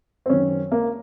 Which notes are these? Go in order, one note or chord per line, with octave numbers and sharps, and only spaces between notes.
C4
F#2 D#3 C#4
A#3